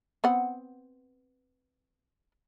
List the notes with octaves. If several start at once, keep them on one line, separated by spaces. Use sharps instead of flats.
B3 C4 F#5